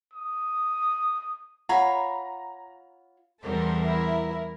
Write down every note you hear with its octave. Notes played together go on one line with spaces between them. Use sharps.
D#6
F4 C#5 F#5 A#5 B5
E2 G3 A4 A#4 C5
E4 A#4